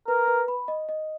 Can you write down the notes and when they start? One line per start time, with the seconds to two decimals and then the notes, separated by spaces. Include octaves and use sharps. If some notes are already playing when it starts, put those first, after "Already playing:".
0.08 A#4 B4
0.28 B4
0.48 B5
0.68 D#5
0.89 D#5